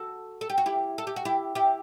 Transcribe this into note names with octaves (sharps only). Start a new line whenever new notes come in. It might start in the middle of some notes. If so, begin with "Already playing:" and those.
Already playing: F#4 A4
A4
G4
F#4
E4 G4
A4
G4
F#4
E4 G4
E4 G4